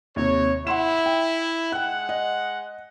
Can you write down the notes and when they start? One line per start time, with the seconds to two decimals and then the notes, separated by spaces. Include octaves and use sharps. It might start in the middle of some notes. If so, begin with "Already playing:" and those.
0.16 D#2 C3 C#5
0.67 E4 F#5 C6 E7
1.06 G5
1.72 G#3 F#5 G5 F#6
2.09 D#5